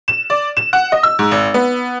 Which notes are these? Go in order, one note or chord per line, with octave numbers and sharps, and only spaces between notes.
E7
D5
E7
F#5
D#5
E6
G#2
G#1
B3